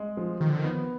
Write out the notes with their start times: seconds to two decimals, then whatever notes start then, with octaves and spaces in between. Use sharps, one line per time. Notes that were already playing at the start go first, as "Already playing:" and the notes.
Already playing: G#3
0.17 F3
0.40 D#3 F3
0.49 D3
0.60 D#3
0.64 B3